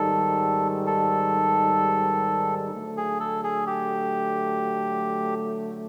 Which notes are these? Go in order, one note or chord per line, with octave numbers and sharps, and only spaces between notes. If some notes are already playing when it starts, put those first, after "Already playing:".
Already playing: G#2 D#3 G3 A4
A4
D3 F#3 A3
G#4
A4
G#4
G4